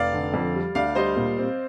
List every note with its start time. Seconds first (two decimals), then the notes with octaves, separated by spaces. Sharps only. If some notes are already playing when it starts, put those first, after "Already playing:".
Already playing: F1 D5 F5
0.13 D3
0.34 F2
0.54 G3
0.75 D2 D5 F5
0.95 G3 C5 D#5
1.16 A#2
1.38 C4